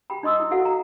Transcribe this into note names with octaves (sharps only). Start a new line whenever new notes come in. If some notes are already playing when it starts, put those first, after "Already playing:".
G4 G5 B5
D#4 D#5 C6 D#6 E6
E4
E4 F#4 A4 F5 F#5
A#5